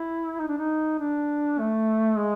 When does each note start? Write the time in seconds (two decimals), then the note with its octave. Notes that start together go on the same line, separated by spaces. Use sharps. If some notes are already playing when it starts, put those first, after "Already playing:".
Already playing: E4
0.40 D#4
0.48 D4
0.57 D#4
0.99 D4
1.59 A3
2.18 G#3